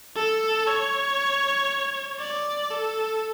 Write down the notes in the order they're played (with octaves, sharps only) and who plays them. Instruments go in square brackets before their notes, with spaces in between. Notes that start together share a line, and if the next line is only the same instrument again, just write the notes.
[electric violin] A4
C#5
D5
A4